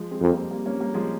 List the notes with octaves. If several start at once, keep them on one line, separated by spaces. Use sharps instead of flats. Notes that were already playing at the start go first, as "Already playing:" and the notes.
Already playing: F3 G#3
G#3 C4
F2 C4
G3 A#3
G3 A#3
A#3 C#4
G3 A#3
F3 G#3